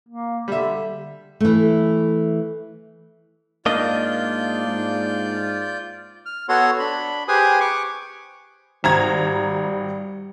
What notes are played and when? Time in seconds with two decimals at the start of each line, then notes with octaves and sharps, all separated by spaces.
0.09 A#3
0.48 D3 G3 E5
1.40 E3 A3
3.66 G#2 A#3 D4 F4 D5 D#5 G6
4.66 G#2
6.26 F6
6.49 B3 F#4 A4 C#5 C6
6.79 D4 B5
7.28 G4 G#4 B4 C5 G#5 D#6
7.61 C#6 D6
8.84 G#1 G3 A#5 G#6